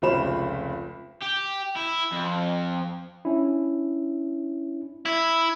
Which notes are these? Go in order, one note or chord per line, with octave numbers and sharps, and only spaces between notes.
F1 C#2 F4 C5 B5 E7
G4
E4
F2
C#4 D4 E4
E4